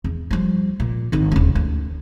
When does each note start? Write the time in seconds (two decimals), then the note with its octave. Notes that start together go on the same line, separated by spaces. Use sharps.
0.04 E2
0.31 F3 G3
0.80 A#2
1.12 G#1 D#3
1.32 D#1 C#3
1.55 D2